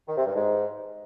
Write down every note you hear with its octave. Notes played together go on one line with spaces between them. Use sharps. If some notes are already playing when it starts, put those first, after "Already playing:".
D#3
C3
G2
G#2